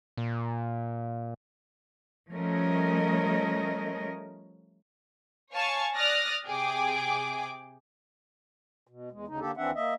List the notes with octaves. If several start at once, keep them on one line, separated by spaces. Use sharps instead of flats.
A#2
F3 G3 A3 C#4 A#4 D#5
C#5 F5 G#5 A5 C#6
D5 D#6 F6 F#6 A6 A#6
C3 G#4 G5 D6
B2
E2 G#3
D2 C#3 D#4
D3 A#3 D4 G4 A4
D#2 E3 C4 D4 E5 F#5
A#3 D#5 E5